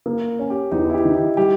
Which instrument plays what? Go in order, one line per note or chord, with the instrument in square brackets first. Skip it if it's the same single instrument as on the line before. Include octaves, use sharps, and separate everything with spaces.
[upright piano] A#3
C#4
[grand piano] G4
[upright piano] E2 [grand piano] D#4
[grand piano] E4
G4
[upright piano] D#3
[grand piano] G4
[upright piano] G3 [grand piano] G4